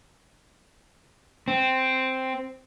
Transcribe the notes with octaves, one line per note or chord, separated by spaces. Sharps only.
C4